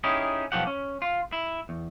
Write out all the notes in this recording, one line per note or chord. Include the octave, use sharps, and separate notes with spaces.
C#4 D#4 E4 G4 G#4
B1 F3 G4 F#5
C#4
F4
E4
E2